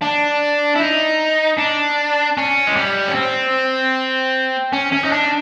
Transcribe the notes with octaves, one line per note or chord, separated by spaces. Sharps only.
D4
E4
D#4
D4
C#4
G#3
G3
C#4
C4
C#4
C#4
D#4
D4